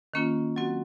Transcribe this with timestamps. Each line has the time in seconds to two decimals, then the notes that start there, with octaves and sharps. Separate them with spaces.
0.14 D#3 A#3 C#4 F4
0.56 F#3 C4 F#4